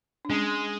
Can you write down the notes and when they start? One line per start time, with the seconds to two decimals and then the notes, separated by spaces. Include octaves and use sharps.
0.25 D4
0.30 G#3 C#4